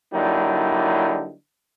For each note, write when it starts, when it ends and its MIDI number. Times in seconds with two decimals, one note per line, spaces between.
0.13 1.33 50
0.13 1.33 54
0.13 1.33 55
0.13 1.33 58
0.13 1.33 63
0.13 1.33 64